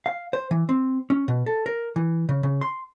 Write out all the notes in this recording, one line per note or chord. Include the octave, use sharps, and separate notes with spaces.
F5
C5
E3
C4
C#4
B2
A4
A#4
E3
C#3
C#3
C6